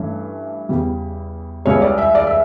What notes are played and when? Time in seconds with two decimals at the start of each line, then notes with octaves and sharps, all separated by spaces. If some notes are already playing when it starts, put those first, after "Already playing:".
Already playing: G2 E3 A3 C#4
0.69 E2 C#3 G3
1.66 C#2 C#3 G3 C#5
1.82 D5
1.98 E5
2.15 D5
2.27 E5